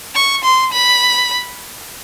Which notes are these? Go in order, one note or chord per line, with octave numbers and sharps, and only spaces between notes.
C#6
C6
B5